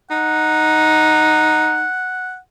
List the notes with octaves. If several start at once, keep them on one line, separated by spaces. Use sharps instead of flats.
D#4 F#5